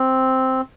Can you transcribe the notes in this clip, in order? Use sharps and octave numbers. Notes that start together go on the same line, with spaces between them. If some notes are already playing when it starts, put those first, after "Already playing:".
Already playing: C4